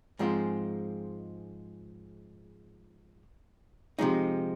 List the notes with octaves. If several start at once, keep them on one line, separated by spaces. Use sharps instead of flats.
G#2 F3 G#3 C4 F4
C3 F3 G#3 D#4